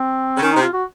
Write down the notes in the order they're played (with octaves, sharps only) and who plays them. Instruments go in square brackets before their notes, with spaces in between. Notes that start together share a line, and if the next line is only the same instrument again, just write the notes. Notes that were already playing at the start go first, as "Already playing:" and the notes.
Already playing: [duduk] C4
[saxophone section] C#3
[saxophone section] D#3 [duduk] C#4
[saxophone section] C3 [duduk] D#4
[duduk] F4
F#4